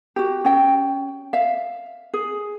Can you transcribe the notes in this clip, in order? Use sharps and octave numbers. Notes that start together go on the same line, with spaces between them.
F#4 G4
C#4 G5
E5 F5
G#4